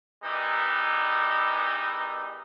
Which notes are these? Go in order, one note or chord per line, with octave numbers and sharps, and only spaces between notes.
D#3 E3 G3 G#3 B3 D#4